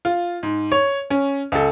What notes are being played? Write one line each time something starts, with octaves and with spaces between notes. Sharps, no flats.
F4
G#2
C#5
C#4
C#2 A4